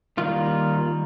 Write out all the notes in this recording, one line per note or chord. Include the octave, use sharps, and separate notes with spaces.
D#3 G3 A#3 F4